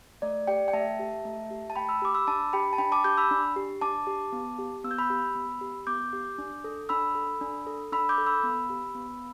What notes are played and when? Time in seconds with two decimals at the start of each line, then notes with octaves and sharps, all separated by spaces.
0.22 A3 D5
0.47 G4 D5 G5
0.68 G5
0.73 A3 E5 A5
0.99 G4
1.25 A3
1.51 G4
1.70 A5
1.76 A3 G5 B5
1.89 B5 E6
2.02 G4 D6
2.14 B5 E6
2.27 D4 A5 D6
2.53 G4 G5 B5
2.73 A5
2.78 D4 G5 B5
2.92 A5 D6
3.04 G4 D6 G6
3.17 B5 E6
3.31 D4
3.56 G4
3.81 D4 A5 D6
4.07 G4
4.32 B3
4.59 G4
4.84 B3 E6
4.91 G6
4.98 B5 E6
5.10 G4
5.35 B3
5.61 G4
5.87 B3 D6 G6
6.13 G4
6.38 D4
6.64 A4
6.89 D4 B5 E6
7.15 A4
7.41 D4
7.67 A4
7.92 D4 B5 E6
8.09 D6 G6
8.18 A4
8.27 B5 E6
8.43 B3
8.70 G4
8.95 B3